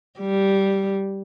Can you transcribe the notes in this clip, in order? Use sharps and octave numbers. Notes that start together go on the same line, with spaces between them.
G3